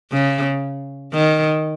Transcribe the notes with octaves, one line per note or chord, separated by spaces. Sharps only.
C#3
D#3